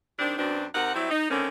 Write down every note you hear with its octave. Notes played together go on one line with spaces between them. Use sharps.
D#3 G3 C4 D4
F#2 B2 C4 D4
C3 D#4 A#4 F#5
F#3 G3 C4 E4
D#4
D3 D#3 A3 A#3 C4 C#4